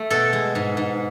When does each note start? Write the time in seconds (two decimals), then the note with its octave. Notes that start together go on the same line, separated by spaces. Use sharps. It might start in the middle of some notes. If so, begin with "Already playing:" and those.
Already playing: A3
0.10 B2 A4
0.33 G#3
0.55 G#2
0.77 G#2